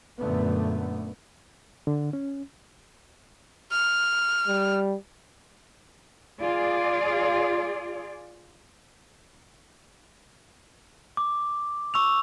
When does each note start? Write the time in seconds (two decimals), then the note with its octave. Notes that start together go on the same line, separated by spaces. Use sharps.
0.19 F#2 A#2 D3 A3 B3
1.87 D3
2.13 C#4
3.72 F6
4.48 G3
6.39 F4 G#4 D5
11.17 D6
11.94 C#6 E6 F7